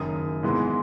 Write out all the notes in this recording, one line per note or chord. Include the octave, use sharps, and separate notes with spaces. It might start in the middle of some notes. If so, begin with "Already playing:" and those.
Already playing: F#1 F#2 D#3 D#6
G#2 E3 G#3 B3 E4